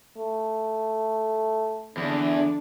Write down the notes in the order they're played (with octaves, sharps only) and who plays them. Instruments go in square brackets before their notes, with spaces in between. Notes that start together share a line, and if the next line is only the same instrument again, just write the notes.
[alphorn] A3
[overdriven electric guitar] E2 [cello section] D3 D4